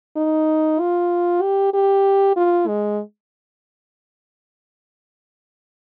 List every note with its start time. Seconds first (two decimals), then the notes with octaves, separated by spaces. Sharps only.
0.17 D#4
0.80 F4
1.42 G4
1.74 G4
2.36 F4
2.68 G#3